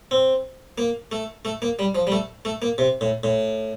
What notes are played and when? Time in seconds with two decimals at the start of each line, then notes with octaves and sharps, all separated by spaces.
0.11 C4
0.78 A#3
1.12 A3
1.45 A3
1.62 A#3
1.79 G3
1.95 F3
2.07 G3
2.12 A3
2.45 A3
2.62 A#3
2.78 C3
3.01 A2
3.24 A2